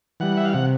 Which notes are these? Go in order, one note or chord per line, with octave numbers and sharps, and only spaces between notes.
E3 G3 F#5
E5
F5
C3 F#5